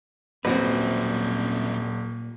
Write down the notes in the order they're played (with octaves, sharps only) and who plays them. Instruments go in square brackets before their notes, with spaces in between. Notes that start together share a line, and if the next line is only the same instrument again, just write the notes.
[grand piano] D#1 [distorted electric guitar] F#2 G3 [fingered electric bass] A#2 [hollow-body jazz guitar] C4 F#4 B4